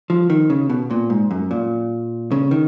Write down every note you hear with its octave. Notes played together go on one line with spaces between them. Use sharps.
F3
D#3
C#3
B2
A#2
G#2
F#2
A#2
C#3
D#3